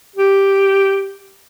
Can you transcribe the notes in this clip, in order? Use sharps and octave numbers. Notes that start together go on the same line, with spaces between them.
G4